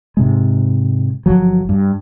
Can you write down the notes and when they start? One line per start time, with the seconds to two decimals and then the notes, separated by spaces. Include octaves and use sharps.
0.17 G#2 C3 G#3
1.26 G1 F3 F#3
1.69 G2